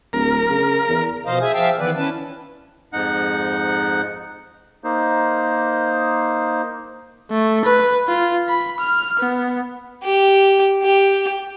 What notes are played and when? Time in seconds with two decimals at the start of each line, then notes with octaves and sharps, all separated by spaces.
0.13 D1 A#4
0.50 C#3
0.88 E2
1.25 B2 F3 C5 D#5 F5
1.41 G#4 E5 G#5
1.54 F3 E5 F5 G5 A5
1.79 D#3 E3 B3 B4 D5
1.97 C#4 E4 B4 A5
2.93 F2 G#2 D#4 F#5
4.84 A#3 D#4 C5
7.31 A3
7.65 B4
8.08 F4
8.49 B5
8.80 F6
9.19 B3
10.04 G4
10.83 G4